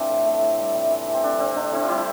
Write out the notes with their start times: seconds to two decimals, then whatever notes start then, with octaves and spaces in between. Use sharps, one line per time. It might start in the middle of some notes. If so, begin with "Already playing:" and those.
Already playing: E3 F3 A3 C4 D4
0.10 A2
0.26 A3
0.42 A2
0.58 G3
0.75 C3
0.90 E3
1.08 E3
1.14 C4
1.23 D3 D4
1.40 D3 C4
1.56 D3 D4
1.73 D3 C4 E4
1.83 F4
1.88 G3 E4 G4